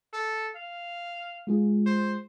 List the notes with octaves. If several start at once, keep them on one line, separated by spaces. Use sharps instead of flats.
A4
F5
G#3 F4 G#4
C5